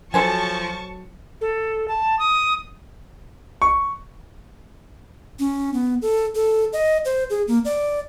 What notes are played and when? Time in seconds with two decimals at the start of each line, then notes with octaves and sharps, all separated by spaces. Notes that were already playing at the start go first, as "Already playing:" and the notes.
0.14 F3 F#3 A4 C5 G#5 A5 C#6
1.41 A4
1.88 A5
2.19 D#6
3.62 C#6
5.39 C#4
5.74 B3
6.02 A4
6.35 A4
6.73 D#5
7.05 C5
7.30 G#4
7.48 A#3
7.65 D5